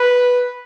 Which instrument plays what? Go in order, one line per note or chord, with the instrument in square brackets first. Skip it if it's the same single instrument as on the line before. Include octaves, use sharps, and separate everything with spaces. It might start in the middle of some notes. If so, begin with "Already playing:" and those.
Already playing: [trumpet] B4